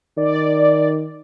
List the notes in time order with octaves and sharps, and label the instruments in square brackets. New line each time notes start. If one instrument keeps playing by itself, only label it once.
[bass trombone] D#3 [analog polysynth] D5